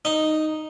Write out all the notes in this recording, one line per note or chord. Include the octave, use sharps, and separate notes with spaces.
D#4